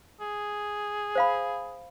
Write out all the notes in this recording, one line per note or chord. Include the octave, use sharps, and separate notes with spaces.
G#4
C5 F5 B5